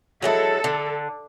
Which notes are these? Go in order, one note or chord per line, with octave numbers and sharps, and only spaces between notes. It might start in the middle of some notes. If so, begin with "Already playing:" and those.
F#3 G#3 E4 A4
D3